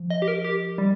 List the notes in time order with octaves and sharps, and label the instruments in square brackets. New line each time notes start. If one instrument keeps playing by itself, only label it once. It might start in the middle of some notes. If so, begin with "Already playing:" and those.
Already playing: [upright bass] F3
[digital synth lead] D#5
G4
A#4
G4
G3